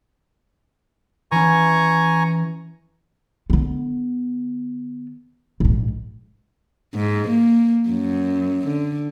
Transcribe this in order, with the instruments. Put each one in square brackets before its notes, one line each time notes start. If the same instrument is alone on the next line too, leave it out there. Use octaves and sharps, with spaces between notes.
[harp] E3 C#4 [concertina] G#5 A#5 C#6
[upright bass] D3 B3
A#1 G#2
[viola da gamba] G#2
A#3
F#2
D3